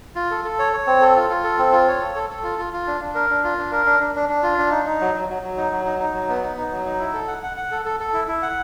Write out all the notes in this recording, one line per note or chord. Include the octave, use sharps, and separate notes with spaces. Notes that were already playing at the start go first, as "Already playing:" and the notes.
F4
A4
A4
C#5
C#5
C4
A4
F4
F4
A4
C4
F4
C#5
A4
A4
A4
F4
F4
F4
D4
D4
A#4
D4
F4
D4
A#4
D4
D4
D4
D4
F4
D4
D#4
D#4
F#3
F#3
F#3
F#3
D#4
F#3
D#4
D#4
F#3
B3
D#4
D#4
F#3
D#4
E4
A4
F#5
F#5
F#5
A4
A4
A4
E4
E4
F#5